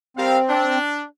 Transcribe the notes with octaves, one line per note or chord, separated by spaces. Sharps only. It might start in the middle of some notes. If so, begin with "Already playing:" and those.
G3 C4 A#4 F5
D4